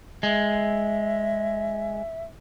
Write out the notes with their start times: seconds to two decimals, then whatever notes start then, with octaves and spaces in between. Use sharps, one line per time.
0.23 G#3 E5